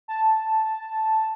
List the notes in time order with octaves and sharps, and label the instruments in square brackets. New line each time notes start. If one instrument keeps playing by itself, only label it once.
[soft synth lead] A5